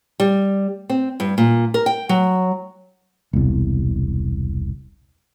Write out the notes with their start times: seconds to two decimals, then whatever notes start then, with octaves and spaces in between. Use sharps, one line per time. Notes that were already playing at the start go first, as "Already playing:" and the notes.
0.20 G3
0.90 C4
1.20 G2
1.38 A#2
1.74 A#4
1.86 G5
2.09 F#3
3.33 E1 C2